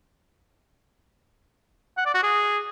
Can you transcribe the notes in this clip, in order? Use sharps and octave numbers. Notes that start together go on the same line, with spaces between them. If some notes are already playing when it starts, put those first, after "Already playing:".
F#5
D5
F#4
G#4